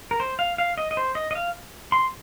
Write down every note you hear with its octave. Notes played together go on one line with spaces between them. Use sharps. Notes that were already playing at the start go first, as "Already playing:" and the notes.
A#4
C5
F5
F5
D#5
D#5
C5
D#5
D#5
F5
C6